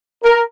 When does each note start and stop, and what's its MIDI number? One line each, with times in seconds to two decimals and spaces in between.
0.24 0.41 70